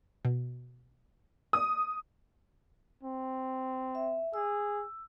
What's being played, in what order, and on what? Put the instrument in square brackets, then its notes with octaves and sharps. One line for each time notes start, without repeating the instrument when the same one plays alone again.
[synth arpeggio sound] B2
[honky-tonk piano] D#6
[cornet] C4
[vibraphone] E5
[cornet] G#4 [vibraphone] E6